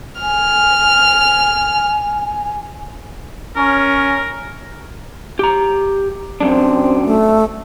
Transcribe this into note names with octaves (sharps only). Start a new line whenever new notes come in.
G#5 F6
C#4 A#4
G4 A#5
F#2 C4 D4
A3